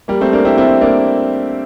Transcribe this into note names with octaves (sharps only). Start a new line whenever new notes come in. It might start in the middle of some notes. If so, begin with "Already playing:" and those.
G3 A#3
A3 C4
A#3 D4
C4 E4
C4 E4
A#3 D4